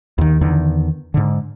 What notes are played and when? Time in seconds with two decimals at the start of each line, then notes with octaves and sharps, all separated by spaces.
0.18 D#2 D#3
0.41 E2 D3 D#3
1.14 G#2 D3